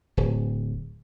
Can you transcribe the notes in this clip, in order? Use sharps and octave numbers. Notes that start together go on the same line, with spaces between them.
D1